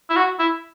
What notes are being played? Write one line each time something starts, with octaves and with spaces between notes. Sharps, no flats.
E4
F#4
E4